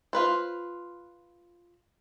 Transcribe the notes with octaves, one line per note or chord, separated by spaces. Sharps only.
F4 B4 C5